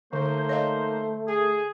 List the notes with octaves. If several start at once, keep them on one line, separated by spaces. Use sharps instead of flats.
D3 A3 A#3 D#4 C5
C#5 D#5 F5
G#4 G#5